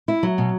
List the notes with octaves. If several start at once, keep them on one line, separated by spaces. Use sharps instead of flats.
E4
F#3
B2